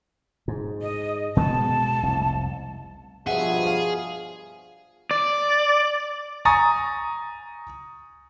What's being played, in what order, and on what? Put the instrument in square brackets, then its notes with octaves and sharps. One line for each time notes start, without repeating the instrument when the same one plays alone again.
[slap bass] G#2
[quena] D#5
[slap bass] B2 G#3 B3 [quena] A5
[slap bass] F1 C2
[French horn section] G2 B2 F3 [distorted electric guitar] G#4 [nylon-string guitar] E5 F#5
[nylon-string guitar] F5
[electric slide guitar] D5
[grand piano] G#5 A#5 C#6 D#6 A6